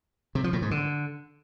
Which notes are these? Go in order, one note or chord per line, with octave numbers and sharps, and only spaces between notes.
C3
F3
A2
G#2
D3